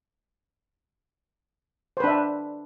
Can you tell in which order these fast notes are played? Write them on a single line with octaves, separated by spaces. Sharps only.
C5 B4 D4 E5